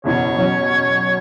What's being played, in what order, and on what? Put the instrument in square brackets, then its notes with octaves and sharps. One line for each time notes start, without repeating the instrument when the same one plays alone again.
[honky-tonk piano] F#1 E2 B2 [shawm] C#5
[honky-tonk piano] B2 F#3 C#4